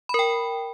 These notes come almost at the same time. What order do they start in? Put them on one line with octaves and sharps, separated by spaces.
B5 A#4 G5